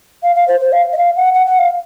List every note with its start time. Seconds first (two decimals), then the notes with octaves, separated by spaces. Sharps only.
0.23 F5
0.36 F5
0.48 C5
0.60 C5
0.72 F5
0.93 D#5
0.98 F5
1.16 F#5
1.34 F#5
1.46 F#5
1.59 F5